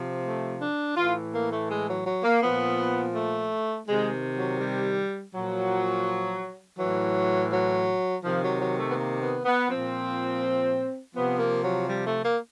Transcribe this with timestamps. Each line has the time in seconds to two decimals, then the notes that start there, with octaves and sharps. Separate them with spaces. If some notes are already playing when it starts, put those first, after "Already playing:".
Already playing: C3 F3
0.24 A3
0.60 D4
0.97 A2 E3 F4
1.34 A#3
1.52 A3
1.71 G#3
1.89 F#3
2.06 F#3
2.24 A#3
2.43 A#2 F3 B3
3.15 A3
3.88 C3 D#3 G#3
4.37 F#3
4.60 G3
5.34 A#2 F3 F#3
6.79 A2 E3 F#3
7.51 F#3
8.24 C3 D#3 F3
8.43 F#3
8.61 F#3
8.79 A3
8.89 B3
8.96 A#3
9.21 B3
9.45 B3
9.69 A#2 F3 C4
11.15 C3 F3 B3
11.39 A#3
11.63 F#3
11.88 G3
12.06 A3
12.24 A#3